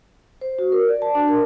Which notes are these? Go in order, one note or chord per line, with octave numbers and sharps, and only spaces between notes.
C5
F#4
A#4
D5
A5
D4
A#4